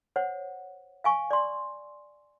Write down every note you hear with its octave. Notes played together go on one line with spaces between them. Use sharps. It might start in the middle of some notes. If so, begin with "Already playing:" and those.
C5 C#5 F#5
F5 G#5 C#6
D5 C6